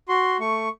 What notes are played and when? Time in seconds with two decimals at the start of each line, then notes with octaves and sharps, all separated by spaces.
0.08 F#4 C6
0.40 A3 C#6